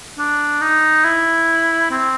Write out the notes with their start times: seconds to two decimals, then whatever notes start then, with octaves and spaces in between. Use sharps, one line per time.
0.18 D4
0.61 D#4
1.04 E4
1.91 C4